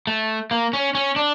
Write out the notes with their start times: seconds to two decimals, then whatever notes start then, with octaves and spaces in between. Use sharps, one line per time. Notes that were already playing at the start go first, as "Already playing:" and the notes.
0.07 A3
0.51 A#3
0.73 C#4
0.95 C#4
1.16 D4